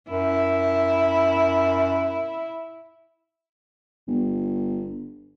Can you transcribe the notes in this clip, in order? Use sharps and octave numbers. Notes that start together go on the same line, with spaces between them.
F#2 E4
G1